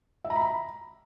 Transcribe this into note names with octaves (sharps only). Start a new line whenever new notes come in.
E5
A#5
B5
A#5